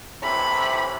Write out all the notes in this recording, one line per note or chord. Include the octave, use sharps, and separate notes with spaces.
A2 C3 E3 B5